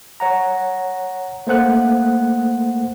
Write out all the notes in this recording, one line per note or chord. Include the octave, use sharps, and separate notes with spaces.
C#5 F#5 A#5
A3 A#3 C5 F#5 F#6